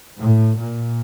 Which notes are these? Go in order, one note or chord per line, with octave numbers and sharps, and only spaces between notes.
A2
A#2